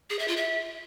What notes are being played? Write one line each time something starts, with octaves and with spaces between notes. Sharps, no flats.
G#4
E5
F4
E5